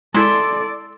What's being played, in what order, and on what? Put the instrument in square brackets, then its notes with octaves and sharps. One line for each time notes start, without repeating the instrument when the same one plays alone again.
[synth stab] G#3 E4 [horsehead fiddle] A4 D5 [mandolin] C6 E6